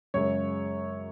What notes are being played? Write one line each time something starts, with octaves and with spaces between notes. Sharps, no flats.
F#2 C#3 G#3 C#5